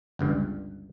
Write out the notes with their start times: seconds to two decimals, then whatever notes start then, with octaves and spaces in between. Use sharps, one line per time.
0.19 G1 C#2 G2